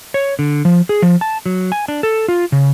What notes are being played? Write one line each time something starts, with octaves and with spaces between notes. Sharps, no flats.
C#5
D3
F3
G#4
F3
A5
F#3
G#5
D4
A4
F4
C#3